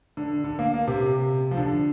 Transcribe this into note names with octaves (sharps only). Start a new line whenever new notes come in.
D3
D3
A#3
A#3
C3
F3
D3